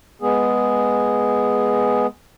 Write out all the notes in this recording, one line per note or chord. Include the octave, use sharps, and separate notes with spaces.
G#3 B3 G#4